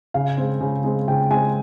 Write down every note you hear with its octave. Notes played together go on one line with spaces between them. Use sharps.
C#3 F5
G#3 C4
C#3
G#3 C4
C#3 G5
G#3 C4 G#5